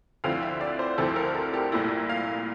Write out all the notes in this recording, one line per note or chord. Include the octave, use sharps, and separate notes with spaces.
D2 D3 F3 C4 E4 F5
E5
D5
C5
D2 D3 F3 C4 E4 A4
A#4
A4
G4
C2 A#2 A3 E4
F5